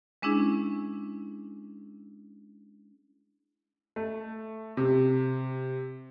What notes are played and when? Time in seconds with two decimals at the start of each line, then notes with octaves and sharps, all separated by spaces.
0.22 G#3 C#4 D4 E4 G#4
3.96 A3
4.77 C3